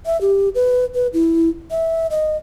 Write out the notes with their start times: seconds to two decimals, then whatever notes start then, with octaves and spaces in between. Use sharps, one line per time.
0.06 E5
0.21 G4
0.55 B4
0.95 B4
1.13 E4
1.71 E5
2.11 D#5